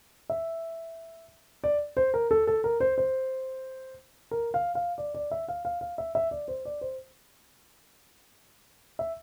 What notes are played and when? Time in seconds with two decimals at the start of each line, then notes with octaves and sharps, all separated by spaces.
0.30 E5
1.64 D5
1.97 C5
2.14 A#4
2.31 A4
2.47 A4
2.64 A#4
2.80 C5
2.98 C5
4.31 A#4
4.54 F5
4.75 F5
4.98 D5
5.14 D5
5.31 E5
5.48 F5
5.65 F5
5.81 F5
5.98 E5
6.15 E5
6.31 D5
6.48 C5
6.65 D5
6.81 C5
8.99 E5